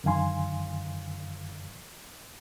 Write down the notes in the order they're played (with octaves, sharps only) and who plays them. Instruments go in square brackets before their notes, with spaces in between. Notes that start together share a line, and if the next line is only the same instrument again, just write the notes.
[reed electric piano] F#2 D3 D#3 F5 G#5 C6